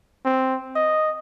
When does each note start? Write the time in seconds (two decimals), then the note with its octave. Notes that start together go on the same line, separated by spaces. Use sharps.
0.25 C4
0.75 D#5